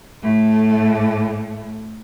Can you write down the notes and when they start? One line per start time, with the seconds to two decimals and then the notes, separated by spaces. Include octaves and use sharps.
0.22 A2 A3